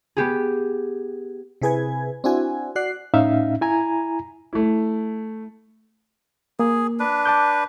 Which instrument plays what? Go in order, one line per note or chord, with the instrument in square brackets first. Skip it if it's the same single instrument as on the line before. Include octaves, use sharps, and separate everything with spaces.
[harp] B3 G4 G#4
[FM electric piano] C3 E4 G#4 B4 G#5 G#6
C4 D4 E4 F#4 G#5
F#4 D5 F#6 C7
[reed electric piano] A2 C#4 D#4 E5 F5
E4 G#5 A#5
[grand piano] A3 E4
[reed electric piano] A#3 [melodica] G#4
[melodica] D4 B4
[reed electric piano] A5 D6 G6